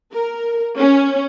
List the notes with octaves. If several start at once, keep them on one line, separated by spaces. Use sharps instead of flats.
A#4
C#4